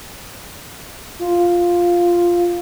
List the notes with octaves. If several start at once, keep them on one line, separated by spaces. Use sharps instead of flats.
F4